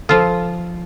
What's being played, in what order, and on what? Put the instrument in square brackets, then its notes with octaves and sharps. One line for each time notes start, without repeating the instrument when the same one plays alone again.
[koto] F3 F4 [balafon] A4